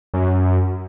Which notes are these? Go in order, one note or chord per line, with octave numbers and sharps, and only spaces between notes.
F#2